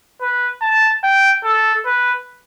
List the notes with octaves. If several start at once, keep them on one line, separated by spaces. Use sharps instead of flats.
B4
A5
G5
A4
B4